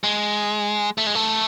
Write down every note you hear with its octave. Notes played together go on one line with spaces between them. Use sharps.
G#3
A3
G#3
A3